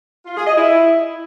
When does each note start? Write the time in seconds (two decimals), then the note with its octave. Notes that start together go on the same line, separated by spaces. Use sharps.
0.25 F4
0.35 G#4
0.46 D#5
0.56 E4